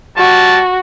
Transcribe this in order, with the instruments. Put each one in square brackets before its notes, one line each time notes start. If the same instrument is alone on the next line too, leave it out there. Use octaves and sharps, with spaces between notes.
[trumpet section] G3 A5 [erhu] F#4